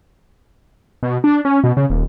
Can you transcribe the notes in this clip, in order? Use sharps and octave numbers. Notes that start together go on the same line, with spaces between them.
B2
D4
C#4
B2
C#3
D#1